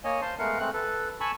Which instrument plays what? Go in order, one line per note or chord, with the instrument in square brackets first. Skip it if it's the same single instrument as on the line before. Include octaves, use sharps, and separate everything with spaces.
[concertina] A#3 C#5 D#5 G#5
C5 F5 A5 C6
G#3 A3 B3 A#4 F5 F#5
G#3 A3 C4 F#6
A4 B4
G#5 A5 B5 C#6 E6